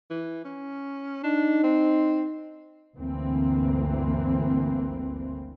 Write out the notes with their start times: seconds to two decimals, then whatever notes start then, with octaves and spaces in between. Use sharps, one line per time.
0.10 E3
0.45 C#4
1.24 D4 D#4
1.64 C4
2.96 G1 D2 E3 A#3 C4